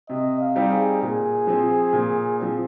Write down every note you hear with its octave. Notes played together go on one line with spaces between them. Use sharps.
C3 D#5
F5
G3 C4 D#4 G4
G#4
A#2 G#4
F3 C4
A#2
F3 C4